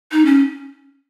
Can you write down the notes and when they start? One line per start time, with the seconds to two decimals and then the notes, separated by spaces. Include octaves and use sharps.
0.12 D#4
0.26 C#4